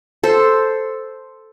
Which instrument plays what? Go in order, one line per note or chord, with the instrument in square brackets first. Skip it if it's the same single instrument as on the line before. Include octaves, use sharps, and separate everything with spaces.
[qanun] A4 C5